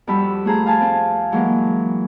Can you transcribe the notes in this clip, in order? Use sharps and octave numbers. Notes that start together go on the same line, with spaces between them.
F2 G3 F#4 G4 B5 E6
A3 F4 G#4 C5 A#5
F5 G#5 A5
C4
E3 F#3 G#3 A#3